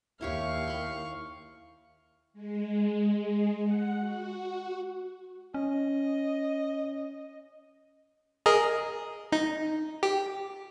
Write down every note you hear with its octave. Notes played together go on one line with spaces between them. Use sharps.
D#2 E4 G4 C#5 F5 C#6
B5 C6
G#3
F#5
F#4
C#4 D#5
G#4 A#4 D#5
D#4
G4